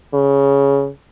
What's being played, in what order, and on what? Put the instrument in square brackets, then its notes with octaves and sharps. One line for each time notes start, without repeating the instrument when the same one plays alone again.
[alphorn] C#3